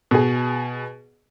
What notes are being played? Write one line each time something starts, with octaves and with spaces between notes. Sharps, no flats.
B2 G#4